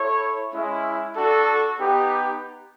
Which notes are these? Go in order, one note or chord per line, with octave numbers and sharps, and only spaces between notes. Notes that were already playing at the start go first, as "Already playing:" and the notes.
Already playing: E4 A4 C#5
G#3 C#4 E4
D4 F#4 A4
B3 D#4 G4